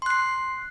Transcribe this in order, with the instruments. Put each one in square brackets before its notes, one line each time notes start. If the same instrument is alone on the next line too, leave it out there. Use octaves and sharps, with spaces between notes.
[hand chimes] C6
F#6
C7